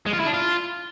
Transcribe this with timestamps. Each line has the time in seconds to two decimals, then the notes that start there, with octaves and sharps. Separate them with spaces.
0.06 G#3
0.13 F4
0.20 E4
0.27 D4
0.34 F4